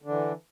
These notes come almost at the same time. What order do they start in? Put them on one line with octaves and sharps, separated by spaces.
D3 D4 E3